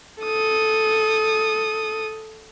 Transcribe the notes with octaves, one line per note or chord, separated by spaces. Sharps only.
A4 D#6